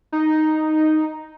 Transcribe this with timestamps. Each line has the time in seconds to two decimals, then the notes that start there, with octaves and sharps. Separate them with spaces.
0.12 D#4